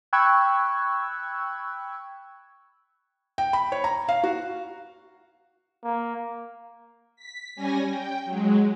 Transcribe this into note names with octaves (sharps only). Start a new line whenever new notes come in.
G5 B5 C#6 E6 F#6 G#6
G5
B5
C#5
A#5
F5
F#4
A#3
B6
G3 C#4 G#5 A#6
G5
F#3 G#3